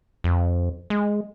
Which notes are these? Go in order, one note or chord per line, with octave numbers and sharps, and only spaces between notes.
F2
G#3